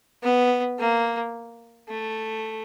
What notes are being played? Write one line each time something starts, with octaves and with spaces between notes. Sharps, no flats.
B3
A#3
A3